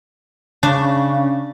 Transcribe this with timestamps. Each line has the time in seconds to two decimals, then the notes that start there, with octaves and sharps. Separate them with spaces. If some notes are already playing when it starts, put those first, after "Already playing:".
0.63 C#3 D4